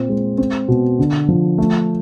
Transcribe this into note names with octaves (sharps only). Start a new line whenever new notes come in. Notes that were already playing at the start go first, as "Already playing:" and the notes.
Already playing: A#2 C4
G#3
C4
B2
D3
F3
A3